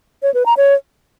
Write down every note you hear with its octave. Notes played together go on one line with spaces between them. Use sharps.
C#5
B4
A#5
C#5